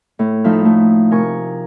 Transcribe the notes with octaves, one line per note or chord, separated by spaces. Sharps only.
A2
F3 A3 D#4 E5 F6
A3
C3 A#4 G#5 C#6